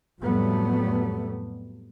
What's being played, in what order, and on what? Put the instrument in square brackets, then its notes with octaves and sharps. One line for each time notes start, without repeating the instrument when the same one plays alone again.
[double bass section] F2 A2 F#3 G3 A3 B3